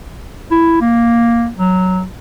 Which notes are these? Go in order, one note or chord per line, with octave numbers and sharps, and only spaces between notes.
E4
A#3
F#3